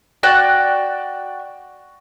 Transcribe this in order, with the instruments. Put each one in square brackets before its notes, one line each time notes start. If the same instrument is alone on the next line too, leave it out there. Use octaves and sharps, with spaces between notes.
[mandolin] F#4 D5 G5 F#6